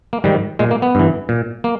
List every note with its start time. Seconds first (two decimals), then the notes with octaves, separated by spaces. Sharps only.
0.13 A#3
0.24 G#2 D#3 G3
0.59 A#2 G#3
0.71 A#3
0.82 B3
0.95 G2 E3
1.29 A#2
1.64 A#3